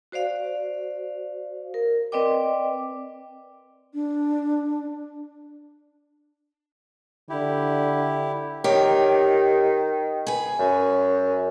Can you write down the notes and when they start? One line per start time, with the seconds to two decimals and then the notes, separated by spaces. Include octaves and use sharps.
0.12 F#4 C5 D5 F5
1.74 A#4
2.12 C4 B4 D5 D#5 G5 D6
3.94 D4
7.29 D3 E4 G4
8.64 D#3 G4 A#4 C#5
10.27 G#4 B4
10.59 F#2